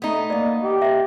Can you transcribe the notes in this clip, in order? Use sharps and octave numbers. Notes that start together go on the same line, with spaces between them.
A3 B3 D#4
A#3 D5 D#5
G4
D#5 E5